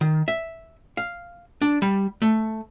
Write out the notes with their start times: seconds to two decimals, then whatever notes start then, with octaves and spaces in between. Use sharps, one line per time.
0.01 D#3
0.28 E5
0.97 F5
1.62 D4
1.82 G3
2.22 A3